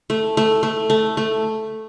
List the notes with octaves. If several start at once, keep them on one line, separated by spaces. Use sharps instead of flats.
A3
A3
A3
A3
A3